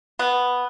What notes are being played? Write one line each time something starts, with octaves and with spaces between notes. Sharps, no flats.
B3